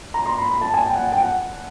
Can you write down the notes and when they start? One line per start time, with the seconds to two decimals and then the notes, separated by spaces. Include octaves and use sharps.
0.14 A#5
0.26 C6
0.38 B5
0.50 B5
0.61 A5
0.74 G#5
0.86 G5
0.95 F#5
1.12 G5
1.21 F#5